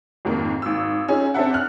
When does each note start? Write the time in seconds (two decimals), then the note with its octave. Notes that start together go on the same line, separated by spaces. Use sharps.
0.25 F2 G#2 D#3 A#3
0.62 G#1 E6
1.08 C#4 D#4 F4 G#4
1.34 C4 D4 A4 E5 F#5
1.54 F6 F#6 F#7